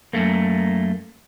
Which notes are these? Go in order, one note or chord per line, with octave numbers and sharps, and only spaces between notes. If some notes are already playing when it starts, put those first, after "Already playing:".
F#2 A3 A#3